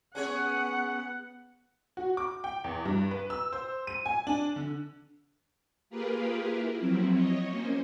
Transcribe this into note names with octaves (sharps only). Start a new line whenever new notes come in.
B3 C#4 G#4 C#5 F#5
F#4
D6
G5
E2
G2
B4
E6
C5
D#7
G#5
D4
D3
A#3 F4 G4 G#4 A#4 B4
E4 A#4
F3 F#3 C4 E4
C#5 D#5
A#3 C#4 C5